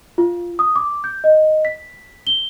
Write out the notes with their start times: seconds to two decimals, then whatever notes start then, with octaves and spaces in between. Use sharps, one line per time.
0.18 F4
0.59 D#6
0.76 D6
1.04 G6
1.24 D#5
1.65 B6
2.27 G7